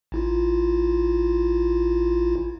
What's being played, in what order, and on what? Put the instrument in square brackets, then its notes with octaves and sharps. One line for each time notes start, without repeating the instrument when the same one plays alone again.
[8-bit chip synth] A1 E4 F4